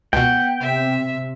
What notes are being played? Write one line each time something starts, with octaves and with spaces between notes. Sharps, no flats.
C#2 B2 B3 F#5 G5
C3 E5